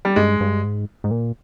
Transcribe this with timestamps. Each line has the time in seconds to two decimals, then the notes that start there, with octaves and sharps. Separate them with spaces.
0.05 G3
0.16 G2 G#3
0.40 G2
0.64 G#2
1.04 G#2
1.11 A#2